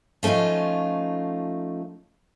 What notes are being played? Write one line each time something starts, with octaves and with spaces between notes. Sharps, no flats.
F3 A3 C#4 D#4 F4